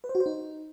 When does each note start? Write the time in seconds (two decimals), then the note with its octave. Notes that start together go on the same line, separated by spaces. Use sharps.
0.04 B4
0.09 C5
0.15 F#4
0.20 C5
0.26 D#4